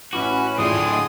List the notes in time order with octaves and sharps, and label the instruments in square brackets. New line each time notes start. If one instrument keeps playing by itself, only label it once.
[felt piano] A1 E4 D6 [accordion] C#4 B4 [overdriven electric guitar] F#4
[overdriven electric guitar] A2 E3 [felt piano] A3 D4 F4 [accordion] G#4 C6 D#6
[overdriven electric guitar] A2 D3
[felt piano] D#5 F#5 A5